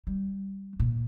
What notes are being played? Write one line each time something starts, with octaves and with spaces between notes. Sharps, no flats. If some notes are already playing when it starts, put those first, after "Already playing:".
G3
A#2